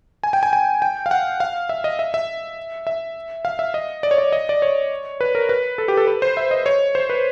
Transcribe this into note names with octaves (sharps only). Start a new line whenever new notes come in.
G#5
G5
G#5
G#5
G5
F5
F#5
F5
E5
D#5
E5
E5
E5
F5
E5
D#5
D5
C#5
D5
D#5
D5
C#5
B4
A#4
B4
A4
G4
A4
B4
C5
E5
D#5
C#5
C5
B4